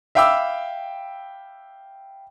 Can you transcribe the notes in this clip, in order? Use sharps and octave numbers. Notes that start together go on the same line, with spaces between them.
E5 F5 G5 B5 D6 E6